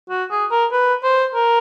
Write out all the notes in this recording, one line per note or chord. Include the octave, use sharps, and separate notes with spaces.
F#4
G#4
A#4
B4
C5
A#4